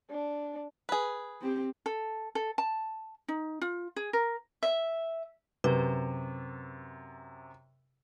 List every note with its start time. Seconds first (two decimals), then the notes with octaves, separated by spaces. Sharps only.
0.11 D4
0.89 G#4 B4
1.42 C4 G4
1.86 A4
2.35 A4
2.58 A5
3.28 D#4
3.61 F4
3.96 G#4
4.13 A#4
4.63 E5
5.64 F#2 C3 B4